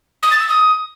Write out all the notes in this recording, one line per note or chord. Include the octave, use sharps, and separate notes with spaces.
D#6
A6
E6
D#6